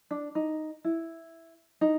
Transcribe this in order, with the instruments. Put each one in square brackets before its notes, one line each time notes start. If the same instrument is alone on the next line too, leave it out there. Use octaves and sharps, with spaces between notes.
[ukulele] D4
D#4
E4
D#4